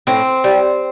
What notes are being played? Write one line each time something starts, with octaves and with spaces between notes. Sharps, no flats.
A2 C4
G3